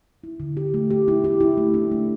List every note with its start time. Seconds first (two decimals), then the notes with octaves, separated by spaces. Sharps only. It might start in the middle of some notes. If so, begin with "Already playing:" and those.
0.24 E4
0.40 D3
0.57 G4
0.74 A3
0.90 G4
1.08 E4
1.24 G4
1.40 E4
1.57 A3
1.74 D4
1.91 A3